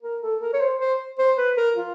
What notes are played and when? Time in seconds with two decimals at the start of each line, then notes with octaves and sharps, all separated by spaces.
0.03 A#4
0.22 A4
0.41 A#4
0.53 C#5
0.61 C5
0.80 C5
1.18 C5
1.38 B4
1.57 A#4
1.76 F4